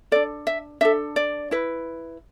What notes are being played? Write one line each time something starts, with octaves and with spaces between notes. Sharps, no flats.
D4 A4 D5
E5
D4 A4 E5
D5
E4 B4